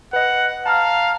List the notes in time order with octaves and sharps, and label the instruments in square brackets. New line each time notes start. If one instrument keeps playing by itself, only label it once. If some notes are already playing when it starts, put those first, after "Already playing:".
[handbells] B4 D#5 [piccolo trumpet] F#5
[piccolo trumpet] F5 [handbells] A5 A#5 F6